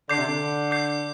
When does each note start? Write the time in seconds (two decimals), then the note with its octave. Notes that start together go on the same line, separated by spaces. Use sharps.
0.09 D3 D6 G6 C7
0.17 C3
0.26 D3
0.71 D6 G6 C7